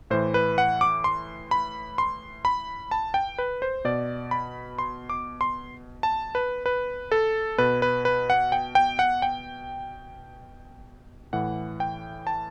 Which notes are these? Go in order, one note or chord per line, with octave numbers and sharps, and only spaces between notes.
A2 E3 C5
B4
F#5
D6
C6
B5
C6
B5
A5
G5
B4
C5
B2 D5
B5
C6
D6
C6
A5
B4
B4
A4
B2 B4
B4
B4
F#5
G5
G5
F#5
G5
A2 E3 F#5
G5
A5